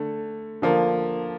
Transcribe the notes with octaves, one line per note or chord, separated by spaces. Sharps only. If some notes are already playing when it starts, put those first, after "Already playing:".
Already playing: D3 A3
D3 F3 A#3